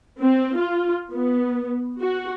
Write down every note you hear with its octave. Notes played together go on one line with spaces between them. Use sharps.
C4
F4
B3
F#4